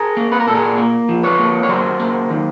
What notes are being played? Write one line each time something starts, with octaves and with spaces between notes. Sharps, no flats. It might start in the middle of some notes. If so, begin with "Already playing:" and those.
Already playing: G#4 A#4
A#3
B4
A#4
A#2 A4
G#4 A#4
A#3
F3
B4 C#5
A#3
C#5
F#3 A#4 C5
A#3
D#3